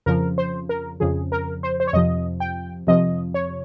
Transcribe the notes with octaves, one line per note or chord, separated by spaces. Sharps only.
F2 C#3 F3 A#4
C5
A#4
F2 C#3 F3 G#4
A#4
C5
C5
C#5
F2 C3 F3 D#5
G5
F2 C3 F3 D#5
C#5